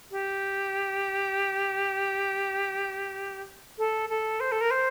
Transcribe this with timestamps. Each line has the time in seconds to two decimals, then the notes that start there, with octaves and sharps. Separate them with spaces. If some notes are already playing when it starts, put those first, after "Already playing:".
0.11 G4
3.78 A4
4.09 A4
4.40 C5
4.52 A4
4.61 A#4
4.70 C5